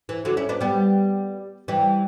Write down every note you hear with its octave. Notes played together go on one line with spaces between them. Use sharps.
E3
D3 F#3
C#4 E4
B3 D4
G3 B3
E3 G3